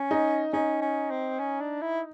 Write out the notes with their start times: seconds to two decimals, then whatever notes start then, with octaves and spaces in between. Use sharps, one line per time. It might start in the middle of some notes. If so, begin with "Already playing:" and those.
Already playing: C#4
0.11 D#4
0.53 C#4 D#4
0.82 C#4
1.11 C4
1.40 C#4
1.61 D4
1.82 E4